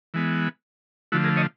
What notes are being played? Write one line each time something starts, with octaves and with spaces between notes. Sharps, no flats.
E3 G#3 B3
D3 F3 A3 E4 F#4
G#4 A#4
C#5 D#5